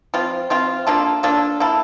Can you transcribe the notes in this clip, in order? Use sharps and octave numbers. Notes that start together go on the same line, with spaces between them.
F3 C4 F4
F3 C4 F4
A#3 D4 F4 A4
A#3 D4 F4 A4
A#3 E4 A4